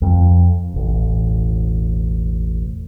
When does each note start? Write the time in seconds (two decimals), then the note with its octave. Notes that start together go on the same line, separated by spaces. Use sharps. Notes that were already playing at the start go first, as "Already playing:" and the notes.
0.02 F2 F3
0.74 E1 A1